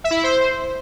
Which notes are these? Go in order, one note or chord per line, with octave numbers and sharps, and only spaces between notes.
E5
E4
E5
C5